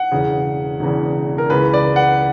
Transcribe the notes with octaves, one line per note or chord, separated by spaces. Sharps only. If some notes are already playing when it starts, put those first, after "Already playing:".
Already playing: F#5
E1 E2 C#3
E1 E2 C#3
A#4
C#2 C#3 E3 B4
D5
F#5